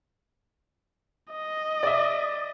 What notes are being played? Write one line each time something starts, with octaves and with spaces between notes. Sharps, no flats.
D#5
D5 E5